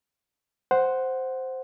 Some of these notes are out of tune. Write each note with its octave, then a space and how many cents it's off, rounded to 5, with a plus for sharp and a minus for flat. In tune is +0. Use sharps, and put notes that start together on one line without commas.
C5 +0 F#5 +0